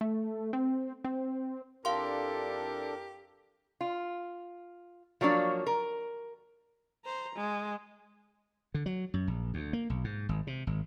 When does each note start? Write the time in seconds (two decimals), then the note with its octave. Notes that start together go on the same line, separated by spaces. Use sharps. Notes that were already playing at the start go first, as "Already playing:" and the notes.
0.01 A3
0.53 C4
1.04 C4
1.85 F2 D4 E4 G4 A4 A#4 F5 C6
3.81 F4
5.21 F3 F#3 A#3 D4 C#5
5.67 A#4
7.05 C5 A#5
7.35 G#3
8.74 D3
8.86 F#3
9.14 F#2
9.28 A#1
9.54 D2
9.73 A#3
9.90 B1
10.04 G#2
10.29 G#1
10.47 C3
10.67 G#1